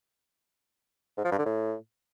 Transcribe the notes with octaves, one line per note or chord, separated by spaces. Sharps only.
G#2
F3
G2
D3
A2